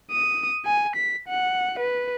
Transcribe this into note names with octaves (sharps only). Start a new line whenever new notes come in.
D#6
G#5
B6
F#5
B4